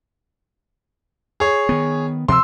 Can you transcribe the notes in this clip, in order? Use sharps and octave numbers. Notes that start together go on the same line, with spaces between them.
G#4 C#5
D#3 B3
C3 F3 C6 E6